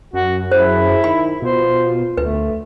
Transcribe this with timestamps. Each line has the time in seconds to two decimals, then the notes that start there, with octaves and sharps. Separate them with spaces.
0.13 F#2 F#4
0.51 E4 G#4 C5
1.04 D#3 B5
1.42 B2 F4 C5
2.17 D2 A3 B4